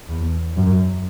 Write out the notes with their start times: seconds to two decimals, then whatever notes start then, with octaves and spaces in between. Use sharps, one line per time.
0.09 E2
0.56 F#2